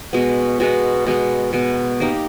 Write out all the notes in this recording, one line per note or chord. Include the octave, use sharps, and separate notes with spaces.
B2 G#3 B3
B2 G#3 B3
B2 G#3 B3
B2 G#3 B3
A#3 D#4 G4